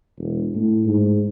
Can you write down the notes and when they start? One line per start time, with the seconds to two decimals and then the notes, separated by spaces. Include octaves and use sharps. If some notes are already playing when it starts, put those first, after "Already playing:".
0.18 E1
0.55 A2
0.86 G#2